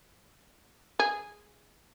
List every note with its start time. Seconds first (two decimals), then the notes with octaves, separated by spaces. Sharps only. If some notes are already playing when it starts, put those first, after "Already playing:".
0.99 G#4